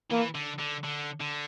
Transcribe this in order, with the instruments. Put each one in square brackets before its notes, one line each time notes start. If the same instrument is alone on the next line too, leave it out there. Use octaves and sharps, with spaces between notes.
[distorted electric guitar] E3 [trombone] A#3
[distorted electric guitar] D3
D3
D3
D3